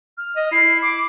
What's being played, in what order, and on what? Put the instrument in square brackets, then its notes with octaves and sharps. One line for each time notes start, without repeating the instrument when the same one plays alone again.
[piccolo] F6
[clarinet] D#5
[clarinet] E4 [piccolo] C7
[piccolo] D6